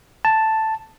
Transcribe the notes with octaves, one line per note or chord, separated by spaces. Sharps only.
A5